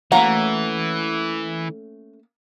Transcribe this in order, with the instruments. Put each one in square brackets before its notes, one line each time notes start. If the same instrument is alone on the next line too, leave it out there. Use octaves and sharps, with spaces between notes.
[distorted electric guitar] E3 [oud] A3 C#4 F#4 [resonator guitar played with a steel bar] A#3 A#5 [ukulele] F#5